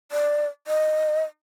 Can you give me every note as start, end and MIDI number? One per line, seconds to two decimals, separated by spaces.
0.12 0.45 74
0.67 1.23 75